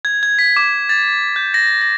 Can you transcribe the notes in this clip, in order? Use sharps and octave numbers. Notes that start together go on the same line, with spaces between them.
G#6
G#6
B6
D6
A6
G6
A#6
A#6